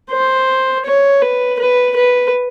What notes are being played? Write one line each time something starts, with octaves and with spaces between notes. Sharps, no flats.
C5
C#5
B4
B4
B4